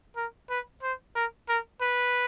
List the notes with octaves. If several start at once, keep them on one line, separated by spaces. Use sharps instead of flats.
A#4
B4
C5
A#4
A#4
B4